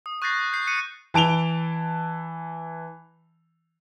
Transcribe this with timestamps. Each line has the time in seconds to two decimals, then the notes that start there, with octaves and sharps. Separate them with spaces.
0.06 D#6
0.22 C#6 F#6 G6 A6 A#6 C7
0.53 G6 C7
0.67 F#6 C#7 D#7
1.14 E3 A5 D7 F7 G7